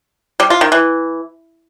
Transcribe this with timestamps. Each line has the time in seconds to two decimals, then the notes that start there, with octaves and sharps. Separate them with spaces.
0.40 G3
0.50 F4
0.61 D#3
0.72 E3